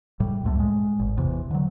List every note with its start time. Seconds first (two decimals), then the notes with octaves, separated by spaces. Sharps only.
0.20 A2 G3
0.44 C#2 F#2 A3
0.59 A2 G#3
0.99 G#1
1.17 E2 C3 E3
1.51 D3 F#3